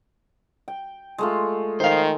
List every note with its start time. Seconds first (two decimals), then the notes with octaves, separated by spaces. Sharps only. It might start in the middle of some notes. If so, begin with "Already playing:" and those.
0.68 G5
1.18 G#3 A3 F4
1.80 D#3 C5 F5